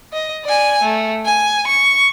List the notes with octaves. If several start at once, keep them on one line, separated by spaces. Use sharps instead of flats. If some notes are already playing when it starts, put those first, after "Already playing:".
D#5
D5 G#5
A3
G#5
C#6